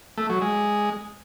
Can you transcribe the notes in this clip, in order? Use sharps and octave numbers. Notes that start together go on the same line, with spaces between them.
A3
F#3
G#3